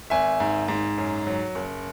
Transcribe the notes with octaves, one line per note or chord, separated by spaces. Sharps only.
G#1 E5 G#5
G#2
G#2
F#2
F#3
F#1